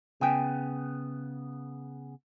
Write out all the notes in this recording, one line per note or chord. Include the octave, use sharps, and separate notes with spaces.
C#3 B3 G5 G#5